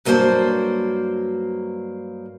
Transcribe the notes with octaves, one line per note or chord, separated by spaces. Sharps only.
G2 F#3 A#3 G4 C5 A5